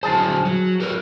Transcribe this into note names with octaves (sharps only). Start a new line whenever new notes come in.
D3 F#3 G#4 C5 A5
F#3
G4 A#4 B4